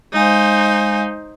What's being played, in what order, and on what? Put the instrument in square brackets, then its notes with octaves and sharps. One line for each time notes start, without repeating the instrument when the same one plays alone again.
[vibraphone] G#3 F5 G#5 [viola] D#4 C5